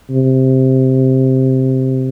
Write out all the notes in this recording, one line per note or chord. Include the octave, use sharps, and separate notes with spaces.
C3